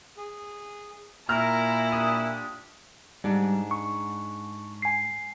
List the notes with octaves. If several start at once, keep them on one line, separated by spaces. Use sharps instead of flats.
G#4
A#2 E4 A#4 A#5 F6
D4 F4 G4 D#6
G#2 G3 D4
C#6
G#5 C7